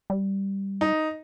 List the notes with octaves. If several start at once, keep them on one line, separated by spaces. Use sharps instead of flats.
G3
D#4